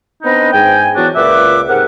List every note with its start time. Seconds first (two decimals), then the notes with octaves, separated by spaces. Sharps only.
0.23 B3 C4 D4 D#4 B4 D#5
0.52 G#2 G5 G#5
0.96 E3 F#3 B3 D4 F#4
1.15 C#2 A#2 B4 E5 F#5 D6
1.68 G#2 C3 A#4 F#5